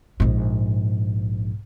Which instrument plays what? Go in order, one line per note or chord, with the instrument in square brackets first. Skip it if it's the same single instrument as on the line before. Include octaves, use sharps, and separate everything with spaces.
[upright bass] A#1 G#2